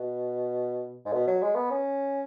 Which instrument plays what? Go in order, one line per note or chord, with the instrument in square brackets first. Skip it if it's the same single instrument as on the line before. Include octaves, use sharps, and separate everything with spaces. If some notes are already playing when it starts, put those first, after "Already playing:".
Already playing: [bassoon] B2
G#2
B2
F#3
G#3
B3
C#4